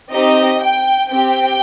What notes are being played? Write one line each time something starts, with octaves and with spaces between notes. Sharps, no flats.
C4 D#4 G4 D#5
G5
C4 G4 G5